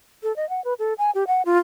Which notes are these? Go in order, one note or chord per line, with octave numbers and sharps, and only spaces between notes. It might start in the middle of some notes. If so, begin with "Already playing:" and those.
A4
D#5
F#5
B4
A4
G#5
G4
F#5
F4